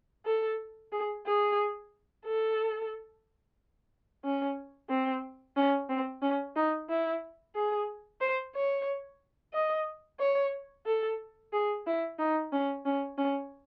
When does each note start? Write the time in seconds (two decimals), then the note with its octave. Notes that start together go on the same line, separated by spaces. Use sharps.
0.26 A4
0.93 G#4
1.26 G#4
2.25 A4
4.25 C#4
4.90 C4
5.57 C#4
5.89 C4
6.22 C#4
6.56 D#4
6.90 E4
7.55 G#4
8.21 C5
8.55 C#5
9.53 D#5
10.20 C#5
10.86 A4
11.53 G#4
11.87 E4
12.19 D#4
12.53 C#4
12.85 C#4
13.18 C#4